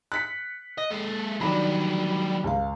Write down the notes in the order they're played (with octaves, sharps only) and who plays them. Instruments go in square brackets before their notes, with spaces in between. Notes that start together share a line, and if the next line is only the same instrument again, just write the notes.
[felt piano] F#6 B6 C#7
[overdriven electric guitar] D#5
G#3 A4
[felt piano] D#3 D4 B5 [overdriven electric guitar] F#3 G3
[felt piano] C#2 F5